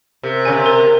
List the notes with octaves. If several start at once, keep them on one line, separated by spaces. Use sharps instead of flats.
C3 A#4
C#3 G#5
C3
A#4